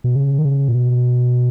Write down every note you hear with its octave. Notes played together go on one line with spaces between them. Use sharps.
B2
C#3
D#3
C#3
A#2
B2